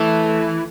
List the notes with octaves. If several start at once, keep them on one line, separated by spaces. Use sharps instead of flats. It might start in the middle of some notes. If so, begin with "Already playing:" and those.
Already playing: E3 A3